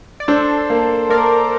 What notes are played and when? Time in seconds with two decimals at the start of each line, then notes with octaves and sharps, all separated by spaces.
0.20 D5
0.28 D4 A4 C5
0.70 A#3
1.10 A#3 A#4 D5